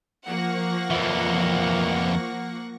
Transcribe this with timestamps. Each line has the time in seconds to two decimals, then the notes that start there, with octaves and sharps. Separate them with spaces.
0.24 F3 A#3 F#5 C#6 A#6
0.90 F2 E3